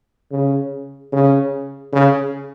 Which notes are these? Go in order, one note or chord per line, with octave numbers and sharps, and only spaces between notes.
C#3
C#3
C#3